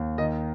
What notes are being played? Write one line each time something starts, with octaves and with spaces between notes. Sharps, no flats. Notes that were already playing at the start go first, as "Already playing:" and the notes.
Already playing: D#2
D#3 D#5